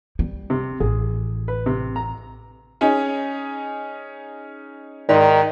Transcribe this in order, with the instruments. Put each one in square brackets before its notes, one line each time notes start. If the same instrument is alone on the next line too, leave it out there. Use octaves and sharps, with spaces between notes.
[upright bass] G3
[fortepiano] C3
[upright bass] A1 [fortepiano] G#4
[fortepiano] B4
C3
A#5
[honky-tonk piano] C#4 D#4 G#4
[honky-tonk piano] G#2 [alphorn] D#3 [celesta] D5